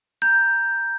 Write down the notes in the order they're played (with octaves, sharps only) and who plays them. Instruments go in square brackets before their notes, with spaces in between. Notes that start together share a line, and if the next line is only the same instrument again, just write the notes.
[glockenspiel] A#5 G6